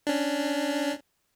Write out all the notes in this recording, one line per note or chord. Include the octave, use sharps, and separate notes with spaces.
C#4 D4